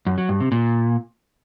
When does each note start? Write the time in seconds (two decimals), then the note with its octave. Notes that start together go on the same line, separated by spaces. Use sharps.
0.07 F#2
0.18 F#3
0.29 G2
0.40 C3
0.52 A#2